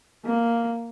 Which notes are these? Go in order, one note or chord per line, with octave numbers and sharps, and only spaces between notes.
A#3